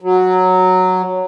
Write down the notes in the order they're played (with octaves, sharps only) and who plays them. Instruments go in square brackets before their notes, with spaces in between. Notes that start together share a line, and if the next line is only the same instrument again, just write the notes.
[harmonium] F#3